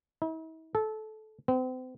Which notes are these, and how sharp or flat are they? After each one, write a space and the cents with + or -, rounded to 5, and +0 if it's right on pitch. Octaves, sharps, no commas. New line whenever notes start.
E4 -45
A4 -20
C4 -40